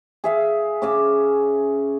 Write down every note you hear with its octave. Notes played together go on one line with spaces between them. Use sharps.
G#4 E5 F5
C#3 C#4 D6